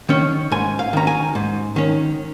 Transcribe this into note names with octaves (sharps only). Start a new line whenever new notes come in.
D#3 C#4
G#2 G#5
F5
D#3 C#4 A#5
G#5
G#2
D#3 C#4